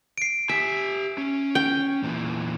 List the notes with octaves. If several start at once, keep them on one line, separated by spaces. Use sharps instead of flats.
C7 D7
G4 E5 G#5
C#4
G5
E2 A#2 E3